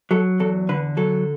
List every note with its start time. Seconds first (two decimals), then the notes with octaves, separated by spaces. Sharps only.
0.11 F#3 A4
0.40 E2 A4
0.69 D3 B4
0.97 F#3 A4